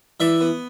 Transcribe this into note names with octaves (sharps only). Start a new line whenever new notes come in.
E3 D5 E5
B3